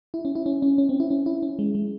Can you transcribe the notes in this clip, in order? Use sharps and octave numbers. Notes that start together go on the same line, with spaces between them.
E4
C#4
E4
C#4
C#4
C#4
C4
E4
C#4
E4
C#4
G#3
G#3